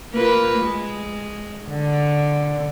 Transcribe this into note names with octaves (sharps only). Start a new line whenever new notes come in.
A#3 F4 B4
G#3
D3